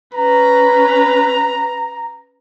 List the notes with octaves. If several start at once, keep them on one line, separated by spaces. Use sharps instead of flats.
C#4 B4 A#5